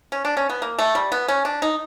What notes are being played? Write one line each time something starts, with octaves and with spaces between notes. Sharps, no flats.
C#4
D4
C#4
B3
A#3
A3
G3
B3
C#4
D4
D#4